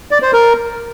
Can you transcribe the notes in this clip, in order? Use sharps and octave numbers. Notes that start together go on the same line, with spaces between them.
D5
C5
A#4